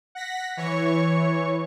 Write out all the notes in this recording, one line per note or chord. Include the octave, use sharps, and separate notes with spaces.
F#5 A#6 B6
E3 C#5 C#6